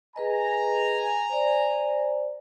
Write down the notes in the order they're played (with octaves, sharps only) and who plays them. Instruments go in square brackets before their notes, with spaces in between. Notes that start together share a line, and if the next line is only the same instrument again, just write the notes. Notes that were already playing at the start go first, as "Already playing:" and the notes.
[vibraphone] G#4 B4 D#5 [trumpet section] G#5 A#5
[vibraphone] C5 D5